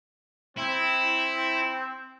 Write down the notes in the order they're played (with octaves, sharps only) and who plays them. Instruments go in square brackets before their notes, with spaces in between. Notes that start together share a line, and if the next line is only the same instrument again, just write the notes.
[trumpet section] C4 [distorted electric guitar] E4